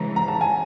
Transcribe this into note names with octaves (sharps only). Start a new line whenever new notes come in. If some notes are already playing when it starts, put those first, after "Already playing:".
Already playing: C#3 E3 G#3 A#5
A#5
A5
G#5